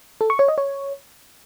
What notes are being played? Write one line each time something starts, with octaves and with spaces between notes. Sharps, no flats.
A4
C#6
C#5
D#5
C#5